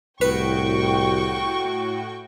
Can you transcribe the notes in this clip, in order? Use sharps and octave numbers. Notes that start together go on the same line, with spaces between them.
C2 A2 F#4 B4 G5 C#6